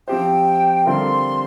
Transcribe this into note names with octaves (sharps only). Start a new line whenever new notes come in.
F3 C4 G4 C5 G5
D3 G3 C4 F4 A#4 C6